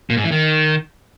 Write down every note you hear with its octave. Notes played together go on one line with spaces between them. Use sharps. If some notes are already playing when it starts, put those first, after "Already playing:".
A#2
G#2
E3
D#3